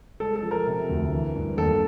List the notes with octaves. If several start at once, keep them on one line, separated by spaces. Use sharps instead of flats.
G#3 A4
A4
F3
A#4
C3
D2
E3
G2
D#2 A4